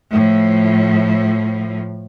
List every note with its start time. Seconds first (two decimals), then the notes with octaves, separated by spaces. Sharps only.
0.11 A2 F3